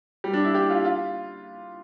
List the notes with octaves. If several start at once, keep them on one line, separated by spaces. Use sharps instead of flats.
G3
D4
E4
G4
F4
F4